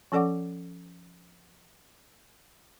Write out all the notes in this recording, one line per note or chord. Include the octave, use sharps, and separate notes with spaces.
F3 C#4 A4 D5 F#5 D6